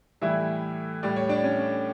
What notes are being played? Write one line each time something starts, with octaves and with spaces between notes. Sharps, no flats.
A2 E3 G3 E4 E5
A2 G3 D5
C#5
D4 D5
C#4 C#5